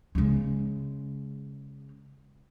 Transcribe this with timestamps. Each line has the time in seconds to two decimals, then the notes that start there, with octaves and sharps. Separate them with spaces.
0.15 C#3 G#3